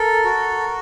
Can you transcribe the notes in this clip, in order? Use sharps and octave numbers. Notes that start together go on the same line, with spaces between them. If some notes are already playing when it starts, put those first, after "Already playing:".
Already playing: A4 A#4
F#4